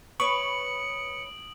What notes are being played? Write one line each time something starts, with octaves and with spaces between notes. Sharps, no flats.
B4 C#5 C#6 D#6 C#7 D7 F#7